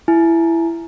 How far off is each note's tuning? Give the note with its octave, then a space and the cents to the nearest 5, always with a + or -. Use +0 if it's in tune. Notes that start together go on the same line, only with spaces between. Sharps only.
E4 +10 G#5 +35